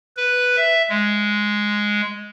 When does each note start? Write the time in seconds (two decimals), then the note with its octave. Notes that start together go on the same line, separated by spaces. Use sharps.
0.17 B4
0.56 E5
0.90 G#3